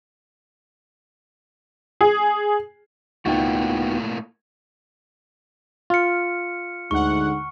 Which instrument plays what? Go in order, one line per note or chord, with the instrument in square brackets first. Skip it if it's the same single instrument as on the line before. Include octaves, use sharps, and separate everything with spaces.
[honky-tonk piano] G#4
[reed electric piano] C#2 D#4 G5 [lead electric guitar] A2 A#3 [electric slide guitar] B3 F4 F#4
[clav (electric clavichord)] F4 [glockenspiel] F6 C#7
[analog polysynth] D2 F#5 [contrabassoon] G#2 [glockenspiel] C#6